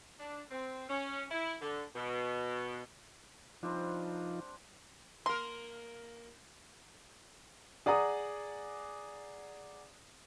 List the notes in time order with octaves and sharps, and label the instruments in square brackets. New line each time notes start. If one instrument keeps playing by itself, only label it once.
[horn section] D4
C4
C#4
E4
D3
B2
[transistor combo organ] F3 D#4 F4 [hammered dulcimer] G3 C4 D4
[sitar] A#3 A#4 [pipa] C6
[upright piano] G#4 D5 F#5 A#5 D#6